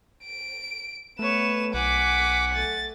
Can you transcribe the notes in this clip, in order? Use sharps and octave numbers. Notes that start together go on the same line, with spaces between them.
D7
A3 B3 B4 C#5 E7
B1 F#5 G#5 D6 B6
A3 A6